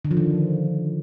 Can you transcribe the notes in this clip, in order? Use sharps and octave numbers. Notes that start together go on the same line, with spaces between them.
D3
F3
D#3